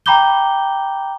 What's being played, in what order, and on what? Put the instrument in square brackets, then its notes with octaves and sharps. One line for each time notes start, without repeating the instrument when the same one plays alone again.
[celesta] G5 A#5 B5 D6 G6 G7